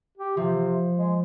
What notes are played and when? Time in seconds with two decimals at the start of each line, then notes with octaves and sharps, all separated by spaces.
0.17 G4
0.37 C3 F3
0.97 G#3